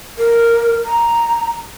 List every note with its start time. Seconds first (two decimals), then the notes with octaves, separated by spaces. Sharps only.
0.18 A#4
0.86 A#5